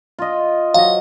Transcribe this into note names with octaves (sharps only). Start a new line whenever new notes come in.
F4 D#5
F#3 C5 D#5 F5